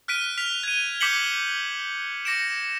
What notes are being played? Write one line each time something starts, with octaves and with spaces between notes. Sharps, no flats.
F6 F#6 B6 D7 D#7
F6 B6 F7
G#6 D#7
D6 G6 B6 C#7 F#7 G7
D6 A#6 C#7 D7 E7